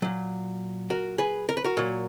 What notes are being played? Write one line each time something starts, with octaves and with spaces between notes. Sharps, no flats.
A#2 F#3
F#4 A#4
G#4 B4
A#4
B4
F#4 A#4
A#2 F#3